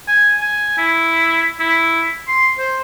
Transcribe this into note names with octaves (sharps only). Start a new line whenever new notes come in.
G#5
G#5
E4
E4
C6
C5